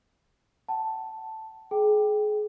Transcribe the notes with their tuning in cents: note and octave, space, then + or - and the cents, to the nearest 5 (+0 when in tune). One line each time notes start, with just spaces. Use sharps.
F#5 +40 A5 +0
G#4 +25 G5 +0